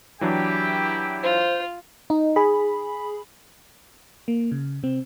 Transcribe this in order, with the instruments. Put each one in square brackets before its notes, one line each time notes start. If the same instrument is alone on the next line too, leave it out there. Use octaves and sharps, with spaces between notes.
[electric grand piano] E3 F#3 D4 [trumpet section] E4 G4 G5
[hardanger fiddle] F4 [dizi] C5
[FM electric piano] D#4
G#4 B5
A#3
C#3
C3 C4